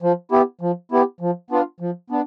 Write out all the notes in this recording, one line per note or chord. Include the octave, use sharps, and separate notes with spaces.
F3
B3 E4 G4
F3
B3 E4 G4
F3
B3 D4 F4
F3
B3 D4